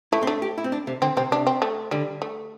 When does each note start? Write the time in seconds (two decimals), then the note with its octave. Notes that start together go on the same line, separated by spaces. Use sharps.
0.12 A3 E4
0.23 C4
0.27 A3 D4
0.42 G4
0.58 E4
0.64 C4
0.72 D4
0.87 C3
1.02 D3 C4
1.17 C3 C4
1.32 C3 D4
1.47 C4
1.62 A3
1.91 D3 G3
2.22 A3